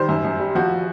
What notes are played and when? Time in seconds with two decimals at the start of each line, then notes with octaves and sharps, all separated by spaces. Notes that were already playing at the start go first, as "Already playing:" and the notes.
Already playing: D#3 G3 C5
0.09 F#2
0.24 F#2
0.39 G3
0.55 F3 F#4